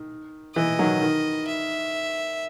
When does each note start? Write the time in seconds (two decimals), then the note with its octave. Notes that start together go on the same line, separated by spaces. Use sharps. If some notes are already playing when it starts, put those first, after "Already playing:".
Already playing: D#3
0.55 E3 D#5
0.79 D#3 F#3
1.01 D#3
1.47 E5